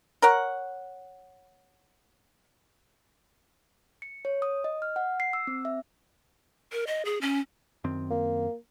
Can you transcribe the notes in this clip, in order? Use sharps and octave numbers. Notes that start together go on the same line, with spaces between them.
A#4 C#5 F#5
C#7
C#5
D#6
D#5
F6
F#5
C7
E6
C4
E5
A#4
D#5
G#4
C#4
F#2 D#3 C4
A#3